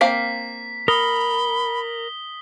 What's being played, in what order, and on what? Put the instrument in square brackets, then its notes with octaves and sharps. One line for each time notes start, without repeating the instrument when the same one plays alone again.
[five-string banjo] A#3 C4 F5 [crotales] B6
[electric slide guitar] A#4 [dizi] B5 [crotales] D#6 G7